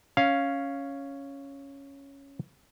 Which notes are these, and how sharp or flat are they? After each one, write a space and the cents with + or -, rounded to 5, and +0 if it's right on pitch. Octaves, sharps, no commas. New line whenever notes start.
C#4 +0 F5 +0